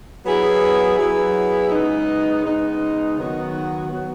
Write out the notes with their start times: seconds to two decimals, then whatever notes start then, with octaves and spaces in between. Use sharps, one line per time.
0.24 F#3 B3 E4 G#4
0.97 F#3 B3 E4 G#4
1.71 C#3 G#3 B3 D#4
2.44 C#3 G#3 B3 D#4
3.17 D#3 F#3 B3 F#4
3.91 D#3 F#3 B3 F#4